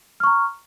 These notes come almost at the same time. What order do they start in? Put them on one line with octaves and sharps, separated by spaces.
F6 C#6 A#5